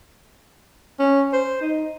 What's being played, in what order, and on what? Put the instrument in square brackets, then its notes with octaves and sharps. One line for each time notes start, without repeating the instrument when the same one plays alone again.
[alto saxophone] C#4
C5
D#4